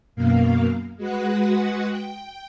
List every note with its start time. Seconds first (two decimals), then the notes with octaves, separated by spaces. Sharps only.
0.16 F#2 B2 A#3 F5
0.97 G#3 F#4 B4 F#5
1.89 G5